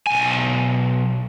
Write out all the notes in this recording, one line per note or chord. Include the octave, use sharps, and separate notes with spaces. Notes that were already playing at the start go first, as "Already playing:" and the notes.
B1 G#5